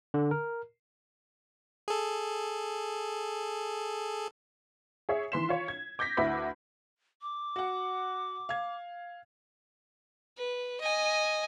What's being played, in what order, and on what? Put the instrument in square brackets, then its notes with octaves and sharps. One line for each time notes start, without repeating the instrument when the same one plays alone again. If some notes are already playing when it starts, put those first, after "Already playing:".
[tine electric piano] D3
A#4
[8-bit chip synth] G#4 A4
[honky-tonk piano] G#4 C#5 E5
D#3 E3 B4 C6 B6 E7
F4 C#5
G#6
D6 G6 G#6 A#6 B6
D2 E4 B4 B5 D6 B6
[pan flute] D6
[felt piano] F#4 F#5
F5 G#6
[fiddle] B4
D#5 G#5